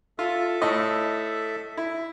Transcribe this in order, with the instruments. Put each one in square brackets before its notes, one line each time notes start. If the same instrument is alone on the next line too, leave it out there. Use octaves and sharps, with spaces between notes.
[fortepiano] F4 [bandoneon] A4 E5
[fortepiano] A2 D#5
E4